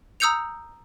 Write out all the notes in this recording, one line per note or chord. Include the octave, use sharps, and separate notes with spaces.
A#5 D#6 E6 G6 C#7 F7